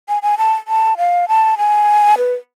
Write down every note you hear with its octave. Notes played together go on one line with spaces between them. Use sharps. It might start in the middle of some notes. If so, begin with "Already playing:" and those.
G#5
G#5
A5
A5
F5
A5
G#5
B4